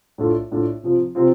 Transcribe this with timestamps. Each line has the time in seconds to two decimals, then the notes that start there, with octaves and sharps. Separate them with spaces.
0.18 A2 A3 D4 F4
0.51 A2 A3 D4 F4
0.83 C3 F3 C4 F4
1.15 C3 F3 C4 F4